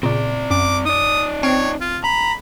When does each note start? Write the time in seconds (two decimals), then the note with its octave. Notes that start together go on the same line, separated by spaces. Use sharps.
0.03 A#2 C#3 C4 D5
0.50 F#2 D6
0.85 D#4 D5 D#6
1.43 C4 C#5
1.81 F4
2.04 A#5 B5